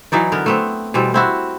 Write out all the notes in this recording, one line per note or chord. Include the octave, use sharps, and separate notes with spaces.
E3 F#3 D#4 D5
D3 B3 A#4
A3 B3 C4
B2 E3 G3 C4
C4 E4 F#4